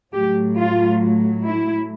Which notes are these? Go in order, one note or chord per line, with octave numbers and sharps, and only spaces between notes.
A2 F#3 A3 G4
F4
E4